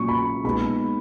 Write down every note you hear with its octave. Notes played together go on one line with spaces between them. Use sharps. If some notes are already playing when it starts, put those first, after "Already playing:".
Already playing: A#2 F#3 C#4 C#6
B5
A#2 G#3 B3 D#4 B5